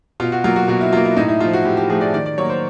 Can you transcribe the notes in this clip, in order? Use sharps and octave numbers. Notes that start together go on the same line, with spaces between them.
B2 F4
F#4
F#3 A#3 F4
F#4
B2 F#4
E4
F#3 A#3 F4
E4
A2 D#4
E4
F3 A3 F4
F#4
A2 G4
G4
F3 A3 G#4
D5
D#3 D5
D5
F#3 A#3 C#5
C5